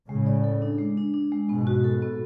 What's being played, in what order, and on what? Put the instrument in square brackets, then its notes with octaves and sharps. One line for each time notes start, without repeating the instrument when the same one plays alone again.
[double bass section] A2 C#3 [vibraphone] G#3
[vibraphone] D5
A4
D4
G#3
D4
D4
G#3
[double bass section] G#2 B2 [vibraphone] B3
[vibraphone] F#4
A4
B3